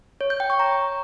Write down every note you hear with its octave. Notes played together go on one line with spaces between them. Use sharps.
C#5
G6
G5
C#6
A#5